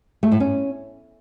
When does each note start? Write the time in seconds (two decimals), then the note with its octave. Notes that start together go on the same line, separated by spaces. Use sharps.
0.23 A3
0.32 A2
0.40 C#4